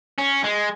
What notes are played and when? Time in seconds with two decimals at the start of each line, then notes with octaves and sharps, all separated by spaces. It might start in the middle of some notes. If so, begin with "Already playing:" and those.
0.19 C#4
0.44 G#3